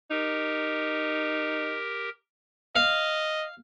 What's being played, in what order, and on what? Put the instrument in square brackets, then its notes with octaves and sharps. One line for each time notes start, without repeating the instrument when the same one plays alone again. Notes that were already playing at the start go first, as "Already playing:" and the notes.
[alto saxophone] D#4 [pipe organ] G4 A#4
[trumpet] D#5 [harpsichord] F5